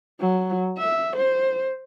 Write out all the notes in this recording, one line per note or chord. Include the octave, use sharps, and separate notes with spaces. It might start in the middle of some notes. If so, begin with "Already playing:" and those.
F#3
E5
C5